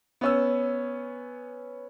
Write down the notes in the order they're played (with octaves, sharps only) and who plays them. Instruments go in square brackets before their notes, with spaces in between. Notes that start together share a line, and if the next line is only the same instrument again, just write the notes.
[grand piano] B3 C#4 E6